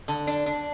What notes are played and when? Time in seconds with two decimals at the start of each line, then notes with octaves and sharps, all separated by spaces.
0.08 D3
0.27 D4
0.46 D4